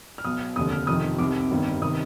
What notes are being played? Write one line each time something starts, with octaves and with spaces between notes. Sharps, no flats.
F6
B1 B2 D#6
F1 D#2 D3 D#6
F6
F1 F2 C3 D#3 D#6
C2 C3 D#3 D6
G1 G2 D#3
C3 D#3 D#6